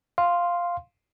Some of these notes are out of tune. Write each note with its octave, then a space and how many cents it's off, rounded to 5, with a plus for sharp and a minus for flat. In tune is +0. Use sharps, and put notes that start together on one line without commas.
F5 +0 C6 +0